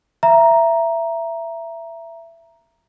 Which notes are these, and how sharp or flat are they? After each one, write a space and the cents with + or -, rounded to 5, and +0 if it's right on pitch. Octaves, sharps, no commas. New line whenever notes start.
E5 +20 A#5 +5